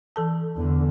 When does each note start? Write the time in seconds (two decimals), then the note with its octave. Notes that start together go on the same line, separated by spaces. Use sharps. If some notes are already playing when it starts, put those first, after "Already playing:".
0.16 E3 A4 A5
0.57 E2 D3